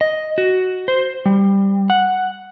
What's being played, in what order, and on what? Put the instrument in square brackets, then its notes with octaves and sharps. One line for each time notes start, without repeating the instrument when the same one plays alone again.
[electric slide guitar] D#5
F#4
C5
G3
F#5